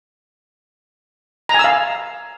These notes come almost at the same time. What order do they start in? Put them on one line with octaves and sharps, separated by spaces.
A#5 G#5 E6 F5